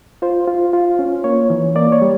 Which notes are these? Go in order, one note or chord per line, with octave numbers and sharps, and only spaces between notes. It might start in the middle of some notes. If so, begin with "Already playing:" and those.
F4 C5
F4
F4
C#4
A#3 C#5
E3
A#3 D5
C#5
G3